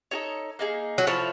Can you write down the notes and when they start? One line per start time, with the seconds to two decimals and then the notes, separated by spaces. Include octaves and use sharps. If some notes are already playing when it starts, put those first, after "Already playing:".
0.11 D#4 F#4 A4 C#5
0.59 A#3 D#4 G#4
0.98 F#3
1.07 F3 E4 A4 C#5